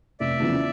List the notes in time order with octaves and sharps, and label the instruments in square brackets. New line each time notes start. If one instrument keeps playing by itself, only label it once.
[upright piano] F1 [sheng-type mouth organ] D5 E5
[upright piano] E2 C#3 F3 A3